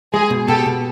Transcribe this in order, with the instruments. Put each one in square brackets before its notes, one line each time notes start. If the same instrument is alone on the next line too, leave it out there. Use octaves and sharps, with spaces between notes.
[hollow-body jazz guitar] G#3 [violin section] G#4
[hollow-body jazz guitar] B2
[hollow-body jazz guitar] B2 [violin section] G4 A4
[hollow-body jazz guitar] B2